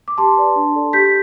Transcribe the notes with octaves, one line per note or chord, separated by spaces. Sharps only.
D6
G4 A5 C6
B4 D5
D4
A4 D5
G4 G6 B6